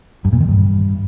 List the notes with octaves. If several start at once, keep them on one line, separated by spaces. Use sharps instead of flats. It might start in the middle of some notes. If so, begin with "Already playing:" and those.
G2
A#2
D#3
G2